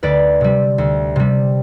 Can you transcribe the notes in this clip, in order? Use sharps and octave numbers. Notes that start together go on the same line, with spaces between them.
D2 B4 D5
C3 G3
D2
C3 G3